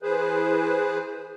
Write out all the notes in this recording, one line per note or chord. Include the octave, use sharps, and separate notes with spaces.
E3 G#4 B4 C5